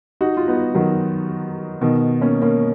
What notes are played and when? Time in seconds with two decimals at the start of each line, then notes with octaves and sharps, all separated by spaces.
0.21 D#4 F#4
0.37 F4
0.48 B3 D#4
0.75 D#3 F#3
1.81 B2 D#3
2.22 A#3 C#4
2.42 A#3 C#4